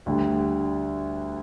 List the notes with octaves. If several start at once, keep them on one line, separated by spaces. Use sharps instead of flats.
D2 D3 G3